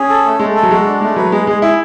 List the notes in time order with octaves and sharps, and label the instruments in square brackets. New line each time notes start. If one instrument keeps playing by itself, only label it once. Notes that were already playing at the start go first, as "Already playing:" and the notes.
Already playing: [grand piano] C#4 [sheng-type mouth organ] G#4
[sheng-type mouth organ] A4
A3
[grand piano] G#3 [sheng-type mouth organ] A3
[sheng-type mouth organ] A4
[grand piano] F#3
[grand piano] G#3 [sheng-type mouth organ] F#4
[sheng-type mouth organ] D4
[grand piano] G#3 [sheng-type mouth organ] A3
[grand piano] F#3 [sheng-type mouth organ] B4
[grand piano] G#3 [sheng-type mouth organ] G#4
[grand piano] G#3 [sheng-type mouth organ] G#4
[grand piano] E4 [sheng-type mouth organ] G#4